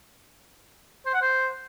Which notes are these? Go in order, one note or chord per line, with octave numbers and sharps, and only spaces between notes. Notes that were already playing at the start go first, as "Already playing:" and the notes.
C5
F#5
C5